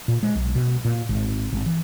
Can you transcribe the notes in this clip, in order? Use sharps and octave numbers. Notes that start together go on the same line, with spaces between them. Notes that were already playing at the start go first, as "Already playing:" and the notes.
A#2
G#3
B1
B2
A#2
G#1
G#1
E3